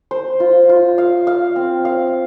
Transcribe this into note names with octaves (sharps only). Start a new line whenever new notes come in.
C5
F4
F4
F5
F5
C4
F5